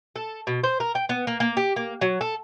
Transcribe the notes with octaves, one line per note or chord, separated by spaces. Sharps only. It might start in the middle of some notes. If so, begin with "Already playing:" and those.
A4
B2
C5
A#4
G5
B3
A#3
A#3
G4
A#3
F#3
A4